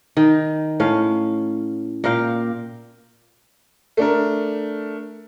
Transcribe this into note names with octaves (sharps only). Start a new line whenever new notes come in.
D#3 D#4
A2 C#4 F5
A#2 A#4 F5 G5
A3 D4 A#4